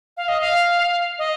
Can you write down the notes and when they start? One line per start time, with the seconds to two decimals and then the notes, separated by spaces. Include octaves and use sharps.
0.17 F5
0.28 D#5
0.40 F5
1.19 D#5